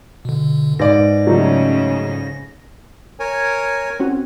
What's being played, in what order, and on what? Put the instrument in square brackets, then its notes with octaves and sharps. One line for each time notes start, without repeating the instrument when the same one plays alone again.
[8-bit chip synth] B2 D3
[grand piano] G#2 D5 [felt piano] B4 [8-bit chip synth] A#6
[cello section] C#3 [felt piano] F#3 A3 D#4
[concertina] A#4 C#5 G#5
[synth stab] C4 C#4 F#4